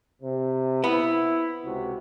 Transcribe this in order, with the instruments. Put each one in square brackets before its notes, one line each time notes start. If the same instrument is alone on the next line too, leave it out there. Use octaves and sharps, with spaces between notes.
[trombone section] C3
[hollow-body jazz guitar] B3 [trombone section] E4
[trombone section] C#2 C3 F#4